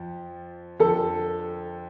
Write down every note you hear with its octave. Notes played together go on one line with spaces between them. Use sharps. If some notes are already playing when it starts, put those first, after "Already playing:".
Already playing: F2 F3
F2 D3 F3 A4